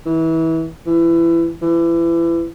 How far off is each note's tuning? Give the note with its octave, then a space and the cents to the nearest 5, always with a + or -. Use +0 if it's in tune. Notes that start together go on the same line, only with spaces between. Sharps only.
E3 -25
E3 +25
E3 +30